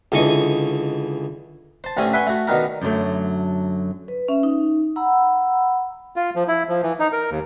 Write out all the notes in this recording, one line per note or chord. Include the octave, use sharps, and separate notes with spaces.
C#2 D3 E3 D#5 C#6
C5 A5
A1 D3 A3 C4 C#4 G#5
B4 E5 F#5 G#5 C6 C#6
A3 F#4
B2 D3 D#3 B3 A#4
F#2 D3 F#3 A3
B4
C#4 E5
D#4
F#5 A#5 B5 E6
F4
F3
E4
F3
E3
D#4
A#4
D#2